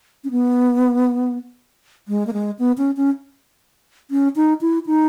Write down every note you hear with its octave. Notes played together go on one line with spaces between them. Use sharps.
C#4
B3
G#3
A#3
G#3
B3
C#4
C#4
C#4
D#4
E4
D#4